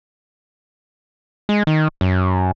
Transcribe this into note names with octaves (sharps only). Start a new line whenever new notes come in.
G#3
D#3
F#2